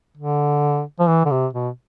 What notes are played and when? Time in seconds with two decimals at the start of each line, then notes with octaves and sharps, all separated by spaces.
0.17 D3
0.99 F3
1.07 E3
1.25 D3
1.31 C3
1.53 B2